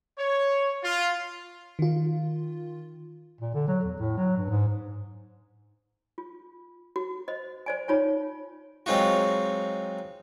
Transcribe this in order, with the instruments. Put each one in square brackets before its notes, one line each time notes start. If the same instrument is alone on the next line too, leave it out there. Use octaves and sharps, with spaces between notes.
[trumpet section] C#5
F4
[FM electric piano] D#3 F4
[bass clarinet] A#2
D3
F#3
E2
A2
F#3
G2
G#2
[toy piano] F4
F#4
C5 D#5
C5 D5 G#5
D#4 F4 C#5 G#5
[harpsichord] F#3 G#3 C4 D#4 F4 F#4